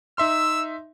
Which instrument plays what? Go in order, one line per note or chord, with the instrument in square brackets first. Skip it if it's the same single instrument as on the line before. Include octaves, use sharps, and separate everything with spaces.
[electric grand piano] D#4 E5 C6 [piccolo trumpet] E6